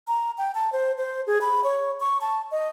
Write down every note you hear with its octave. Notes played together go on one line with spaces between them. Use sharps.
A#5
G5
A5
C5
C5
G#4
B5
C#5
C#6
A5
D#5